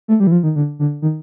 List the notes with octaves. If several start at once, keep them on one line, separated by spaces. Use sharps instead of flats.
A3
G3
E3
F3
D#3
D3
D3
D#3